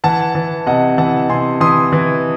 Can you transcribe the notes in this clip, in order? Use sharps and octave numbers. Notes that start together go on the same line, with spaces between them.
E3 F#5 A5
E3
C3 D#5 F#5
E3 F#5 A5
C3 G#5 C6
E3 C6 D#6
E3